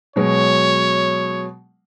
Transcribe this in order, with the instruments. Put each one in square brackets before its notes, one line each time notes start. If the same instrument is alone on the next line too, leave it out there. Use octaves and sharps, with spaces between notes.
[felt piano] B2 F#3 G#3 [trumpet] C#5